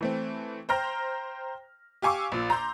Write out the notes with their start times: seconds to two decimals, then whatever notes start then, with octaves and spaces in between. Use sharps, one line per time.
0.01 E3 A3 C4
0.69 C5 G5 A#5 F6 A#6
2.02 G4 F5 G#5 C#6 D6 E6
2.32 A#1 A#2
2.50 A#5 C6 G6